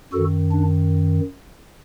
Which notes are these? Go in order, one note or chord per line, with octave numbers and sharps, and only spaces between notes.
F#2 D#3 F#4 A4
D4